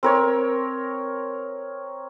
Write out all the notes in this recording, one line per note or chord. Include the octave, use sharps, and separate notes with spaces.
C4 A#4 C#5